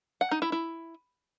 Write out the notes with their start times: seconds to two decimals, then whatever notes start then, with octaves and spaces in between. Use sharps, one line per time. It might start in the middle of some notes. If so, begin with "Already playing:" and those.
0.21 F#5
0.31 D#4
0.42 E4
0.52 E4